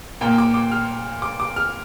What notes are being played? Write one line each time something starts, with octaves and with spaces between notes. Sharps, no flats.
A#2 A#3 G5
D6
D6
F6
D6
D6
F6